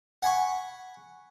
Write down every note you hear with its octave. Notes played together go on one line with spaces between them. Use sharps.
F#5 G#5 B5 C#6